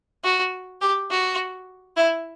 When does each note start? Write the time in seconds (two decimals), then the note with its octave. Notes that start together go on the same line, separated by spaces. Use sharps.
0.24 F#4
0.81 G4
1.10 F#4
1.97 E4